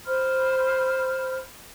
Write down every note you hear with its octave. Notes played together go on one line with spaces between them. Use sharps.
C5 B5 C6 F6